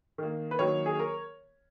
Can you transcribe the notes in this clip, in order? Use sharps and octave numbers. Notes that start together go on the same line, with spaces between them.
D#3 A#3
B4
D#3 F#3 A#3 C#5
G#4
A#4